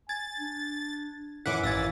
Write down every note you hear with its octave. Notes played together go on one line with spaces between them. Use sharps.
G#5 G#6 A6
D4
F#2 D#3 E3 E4 F#5 D6 B6
A1 F5 E6 G#6 A6